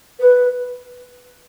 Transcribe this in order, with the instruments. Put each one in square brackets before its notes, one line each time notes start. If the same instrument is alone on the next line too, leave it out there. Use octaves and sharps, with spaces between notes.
[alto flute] B4